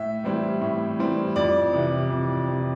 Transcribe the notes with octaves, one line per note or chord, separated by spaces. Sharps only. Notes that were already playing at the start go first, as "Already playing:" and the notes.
Already playing: A2 E5
E3 G3 C4 E4
A2
E3 G3 C4 E4
F2 D5
C3 E3
F2
C3 E3